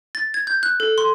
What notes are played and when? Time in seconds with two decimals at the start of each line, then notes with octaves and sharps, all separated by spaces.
0.15 A6
0.34 G#6
0.47 G6
0.63 F#6
0.80 A4
0.98 C6